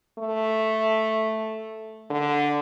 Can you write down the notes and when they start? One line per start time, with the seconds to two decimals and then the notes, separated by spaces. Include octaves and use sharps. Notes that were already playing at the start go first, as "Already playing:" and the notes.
0.19 A3
2.10 D3